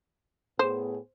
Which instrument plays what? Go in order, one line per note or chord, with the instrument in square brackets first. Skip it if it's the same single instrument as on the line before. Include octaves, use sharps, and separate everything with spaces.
[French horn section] A2 B3 G#4 [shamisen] C5